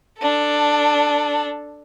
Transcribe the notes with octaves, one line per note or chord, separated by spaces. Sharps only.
D4 A4